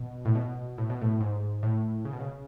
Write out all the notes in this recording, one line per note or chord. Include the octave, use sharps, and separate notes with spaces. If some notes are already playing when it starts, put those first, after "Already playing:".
Already playing: B2
A2
B2
A2
B2
A2
G#2
A2
C#3
B2
C#3